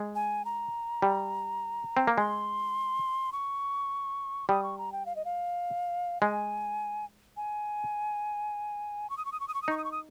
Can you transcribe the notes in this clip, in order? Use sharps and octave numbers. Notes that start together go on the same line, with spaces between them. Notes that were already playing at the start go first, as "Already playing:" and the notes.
Already playing: G#3
G#5
A#5
G3
C4
A#3
G#3 C6
C#6
G3 D#6
C#6
A#5
G5
F5
D#5
F5
G#3 G#5
G#5
C#6
D#6
C#6
D#6
C#6
D#6
C#6
D#6
D#4 C#6
D#6
C#6
D#6